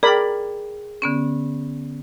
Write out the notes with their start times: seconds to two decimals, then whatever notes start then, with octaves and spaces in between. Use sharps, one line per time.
0.03 G#4 A#4 D5 G5 B5
1.02 D3 B3 C#4